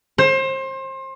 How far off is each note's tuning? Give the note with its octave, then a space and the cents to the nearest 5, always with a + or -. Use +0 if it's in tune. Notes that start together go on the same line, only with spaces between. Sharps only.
C5 +30